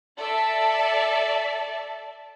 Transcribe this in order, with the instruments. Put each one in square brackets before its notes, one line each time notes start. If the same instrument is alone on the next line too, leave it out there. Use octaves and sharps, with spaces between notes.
[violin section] A4 D5 E5 A5